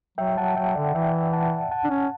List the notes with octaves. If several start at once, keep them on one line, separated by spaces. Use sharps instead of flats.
F#3 E5 G5
F#3 F#5 A5
F#3 E5 G5
D3 D5 F#5
E3 E5 G5
F#5 A5
F#5 A5
D4
C#4